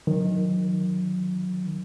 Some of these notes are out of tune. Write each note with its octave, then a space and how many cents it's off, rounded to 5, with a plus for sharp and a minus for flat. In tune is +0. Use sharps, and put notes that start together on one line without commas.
D#3 +0 F#3 -20